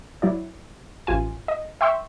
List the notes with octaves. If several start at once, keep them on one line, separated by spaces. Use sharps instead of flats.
F#3 E4 D5
A1 F4 G#5
D#5
E5 G5 C6 C#6 E6